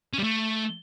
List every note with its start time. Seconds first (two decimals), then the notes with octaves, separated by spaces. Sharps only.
0.13 C#4
0.18 G3
0.23 A3